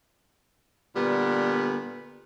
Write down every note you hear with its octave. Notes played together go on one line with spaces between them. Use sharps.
A#2 D3 G3 B3